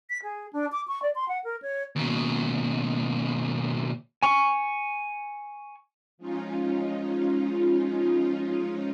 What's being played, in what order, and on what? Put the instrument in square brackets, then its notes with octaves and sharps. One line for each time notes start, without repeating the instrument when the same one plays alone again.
[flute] B6
G#4
D4
D6
C#6
D5
C6
F#5
A#4
C#5
[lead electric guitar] D#2 B2
[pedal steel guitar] G#5 C#6
[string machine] F3 G#3 C#4 D#4 F4